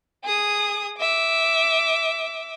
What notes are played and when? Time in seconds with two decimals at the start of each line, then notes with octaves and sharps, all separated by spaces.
0.24 G#4 D#6
0.99 E5 D6